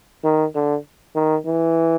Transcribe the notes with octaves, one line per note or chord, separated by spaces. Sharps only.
D#3
D3
D#3
E3